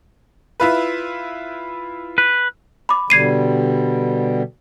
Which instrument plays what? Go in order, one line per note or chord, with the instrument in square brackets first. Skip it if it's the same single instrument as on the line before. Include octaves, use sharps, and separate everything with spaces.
[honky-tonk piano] E4 F4 B4
[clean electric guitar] B4
[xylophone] B5 D6
[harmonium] B2 D3 G3 [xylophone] G#6 C7 D#7